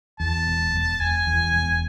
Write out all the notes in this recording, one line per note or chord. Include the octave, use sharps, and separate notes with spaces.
E2 A5
E1
E1
E1 G#5
E2
E1